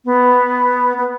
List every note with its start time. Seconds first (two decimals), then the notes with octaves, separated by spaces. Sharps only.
0.05 B3
0.97 B3